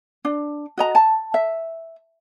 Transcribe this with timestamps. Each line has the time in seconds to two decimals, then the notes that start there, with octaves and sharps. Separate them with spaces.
0.25 D4
0.78 F#4 D#5 A#5
0.95 A5
1.34 E5